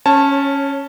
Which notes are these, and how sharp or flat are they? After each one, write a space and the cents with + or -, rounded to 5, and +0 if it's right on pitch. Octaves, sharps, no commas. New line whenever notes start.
C#4 +0 C#5 -25 A5 +0